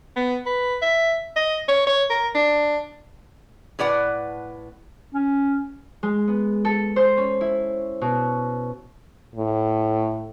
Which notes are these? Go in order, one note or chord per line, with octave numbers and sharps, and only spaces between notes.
B3
B4
E5
D#5
C#5
C#5
A#4
D4
A2 B4 D5 F#5
C#4
G#3
B3
A4
C5
C#4
E4
B2
A2